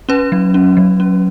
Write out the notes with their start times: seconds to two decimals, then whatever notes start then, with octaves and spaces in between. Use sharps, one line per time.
0.09 C#4 B4
0.32 F#3
0.54 C#4
0.77 F#3
1.00 C#4